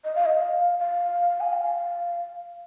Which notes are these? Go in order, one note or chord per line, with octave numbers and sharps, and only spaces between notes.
D#5
F5
D#5
F5
F5
G#5
F5